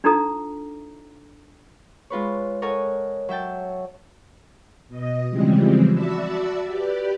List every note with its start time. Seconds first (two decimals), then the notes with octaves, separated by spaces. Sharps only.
0.04 D4 D#4 F4 A4 A#5 D#6
2.10 G#3 F4 B4 C#5
2.62 A4 A#4 C#5 D#5 F#5 G#5
3.29 F#3 E5 G5 A5
4.88 B2 D#5
5.29 C#3 E3 F3 G3 G#3 C4
5.91 F#4 D5 E5 A5 B5 E6
6.65 G4 B4 D5